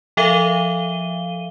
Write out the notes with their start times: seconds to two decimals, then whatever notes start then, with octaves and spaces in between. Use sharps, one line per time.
0.17 F3 A4 E5 F5 D#7 G7